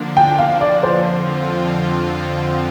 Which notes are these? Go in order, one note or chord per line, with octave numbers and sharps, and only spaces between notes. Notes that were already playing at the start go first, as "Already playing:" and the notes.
Already playing: D3 F3 A#3 D4
G5
F5
D5
F2 D3 F3 C4 F4 C5